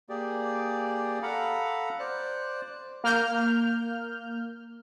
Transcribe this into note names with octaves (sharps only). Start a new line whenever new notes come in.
A#3 G4 G#4 D5
A4 F5 F#5 A#5 B5
C5 D5 F#6
A#3 F6 G6